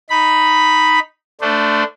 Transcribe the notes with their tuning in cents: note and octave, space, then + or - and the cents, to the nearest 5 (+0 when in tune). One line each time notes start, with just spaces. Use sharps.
D#4 +0 B5 +0
A3 +15 D4 -5 C5 -35